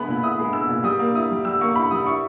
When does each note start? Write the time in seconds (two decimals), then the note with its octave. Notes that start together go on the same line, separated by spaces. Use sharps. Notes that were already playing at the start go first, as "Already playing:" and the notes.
Already playing: G#3 B3 E4 B5
0.08 A#2
0.22 E4 D#6
0.39 G#3
0.53 B3 E6
0.69 A#2
0.84 G3 D#6
0.99 A#3
1.15 E4 D#6
1.31 G3
1.45 G3 E6
1.61 A#3 C#6
1.75 E4 B5
1.91 G3 D#6
2.07 E4 C#6